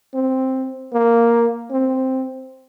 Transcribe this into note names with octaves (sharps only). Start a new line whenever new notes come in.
C4
A#3
C4